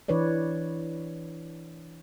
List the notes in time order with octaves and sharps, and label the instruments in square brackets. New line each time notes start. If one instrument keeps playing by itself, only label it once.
[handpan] E3 D4 B4 C#5 D5